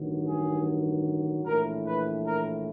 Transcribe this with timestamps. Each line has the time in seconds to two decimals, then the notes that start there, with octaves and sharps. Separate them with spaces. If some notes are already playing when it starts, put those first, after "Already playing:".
Already playing: A1 G2 D#3 F#3
0.27 G#4
1.46 A#1 A2 E3 A#4
1.87 B4
2.26 A#4